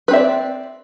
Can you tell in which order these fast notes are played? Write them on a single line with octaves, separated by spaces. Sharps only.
B4 C4 E5 D5